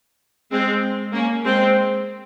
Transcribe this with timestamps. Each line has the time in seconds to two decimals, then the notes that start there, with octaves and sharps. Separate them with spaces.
0.51 G#3 C4
1.13 A#3 C#4
1.45 G#3 C4